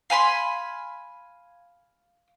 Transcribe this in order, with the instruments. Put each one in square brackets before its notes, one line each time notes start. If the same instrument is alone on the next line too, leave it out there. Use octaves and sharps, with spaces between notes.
[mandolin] F5 G#5 B5 C6